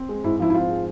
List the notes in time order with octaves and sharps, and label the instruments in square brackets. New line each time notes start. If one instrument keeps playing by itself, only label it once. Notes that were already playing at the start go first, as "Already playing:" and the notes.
Already playing: [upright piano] C4
G#3
[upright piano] G#2 [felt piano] E4
[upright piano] F3 [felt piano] E4
[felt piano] E4
[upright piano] C4 [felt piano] F4
[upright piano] G#3